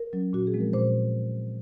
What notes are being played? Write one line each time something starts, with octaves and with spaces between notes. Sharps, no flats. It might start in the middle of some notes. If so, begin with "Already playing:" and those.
Already playing: A#4
F#3 C#4
A#2 F#4
G#4
F3 G#3 C4
A#4
A#2 C5